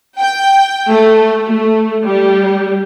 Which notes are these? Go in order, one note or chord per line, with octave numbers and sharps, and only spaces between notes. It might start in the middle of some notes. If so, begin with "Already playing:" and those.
G5
A3
A3
G3